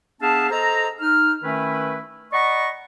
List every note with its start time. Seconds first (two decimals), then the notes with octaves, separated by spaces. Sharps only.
0.22 B3 D4 G#4 E5 F5 A5
0.51 A4 C5 D#5 A#5
1.00 D#4 F6
1.43 D#3 A3 C#4 E4 B4
2.33 D5 D#5 F#5 A#5 B5 C#6